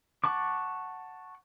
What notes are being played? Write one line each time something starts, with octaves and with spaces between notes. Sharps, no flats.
F#5 A5 C#6 D6